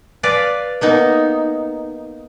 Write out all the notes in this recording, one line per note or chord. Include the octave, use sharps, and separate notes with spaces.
B4 D5 F5
A#3 B3 D#4